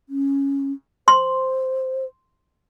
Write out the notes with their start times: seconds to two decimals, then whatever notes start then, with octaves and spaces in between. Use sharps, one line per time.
0.09 C#4
1.08 C5 C6